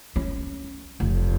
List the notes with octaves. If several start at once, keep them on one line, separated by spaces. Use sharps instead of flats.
C#4
F1